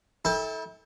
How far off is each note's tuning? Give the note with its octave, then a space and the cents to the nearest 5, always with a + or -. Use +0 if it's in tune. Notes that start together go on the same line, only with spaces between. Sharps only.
E4 -35 A4 -5 G5 +30